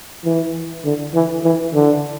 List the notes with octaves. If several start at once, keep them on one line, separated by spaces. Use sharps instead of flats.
E3
D3
E3
E3
D3